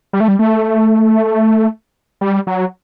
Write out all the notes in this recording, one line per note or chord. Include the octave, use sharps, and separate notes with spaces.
G3
A3
G3
A3
G3
F#3